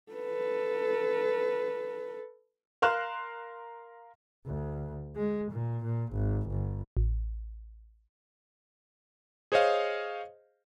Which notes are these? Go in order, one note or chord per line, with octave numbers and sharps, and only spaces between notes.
A4 B4
A#4 F5 C6 F6 F#6 E7
D2
G#3
A#2
A#2
G#1
G1
A1
G#4 C5 C#5 D#5 F5